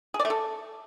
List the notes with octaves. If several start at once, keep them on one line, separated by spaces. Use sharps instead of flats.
G#4
D5
A3
A4